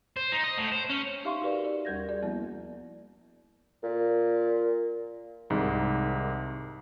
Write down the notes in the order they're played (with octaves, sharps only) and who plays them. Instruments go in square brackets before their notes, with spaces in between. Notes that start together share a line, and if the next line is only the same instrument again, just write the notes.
[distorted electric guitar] C5
D#4
D#5
A2
C5
C#4
[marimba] D#4 G4 E5 F5 C6 C#6
D#4 F#4 G4 A#4 B4 D5
D5
D#2 G3 A#4 G6 G#6 A#6
F#4 G#4 D5
F3 G3 A#3 B3 E4
[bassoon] A#2
[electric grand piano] C2 G#2 D#3